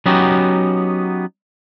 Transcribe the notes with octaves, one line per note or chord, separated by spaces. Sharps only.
F#3 B3 C#4 D#4 F#4 G4